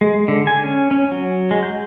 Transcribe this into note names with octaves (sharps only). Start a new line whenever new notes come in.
G#3
D3
G#5
C#4
C#4
F#3
G#3
G6